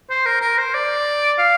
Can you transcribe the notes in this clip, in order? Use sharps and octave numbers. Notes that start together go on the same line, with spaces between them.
C5
A#4
A#4
C5
D5
F5